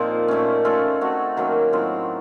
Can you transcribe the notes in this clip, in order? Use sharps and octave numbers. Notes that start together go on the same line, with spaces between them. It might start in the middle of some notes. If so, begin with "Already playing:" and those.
Already playing: A#2 F3 A#3 C4 D#4
A#2 A3 C#4
A3 C#4 F4 A4
A3 C4 F#4
D#3 F#3 A#3 C#4
A2 F#3 C4 F4